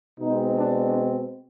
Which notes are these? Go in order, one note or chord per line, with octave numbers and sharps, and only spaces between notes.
B2 G#3 C4 D#4
D4